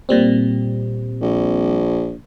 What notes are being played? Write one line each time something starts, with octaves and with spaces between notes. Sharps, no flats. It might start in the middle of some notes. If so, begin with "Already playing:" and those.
A#2 G3 C4
A#1